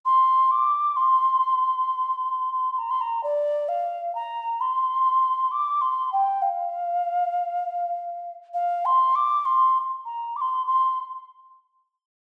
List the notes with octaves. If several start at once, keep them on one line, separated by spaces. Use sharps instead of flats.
C6
D6
C6
A#5
C6
A#5
D5
F5
A#5
C6
D6
C6
G5
F5
F5
C6
D6
C6
A#5
D6
C6
C6